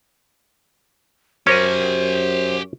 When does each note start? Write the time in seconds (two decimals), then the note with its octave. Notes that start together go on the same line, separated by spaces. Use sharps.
1.47 F#2 C#4 G4 A#4 C5 G#5